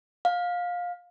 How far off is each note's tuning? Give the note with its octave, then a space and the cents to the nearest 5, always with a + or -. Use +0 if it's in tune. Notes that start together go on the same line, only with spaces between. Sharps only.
F5 +20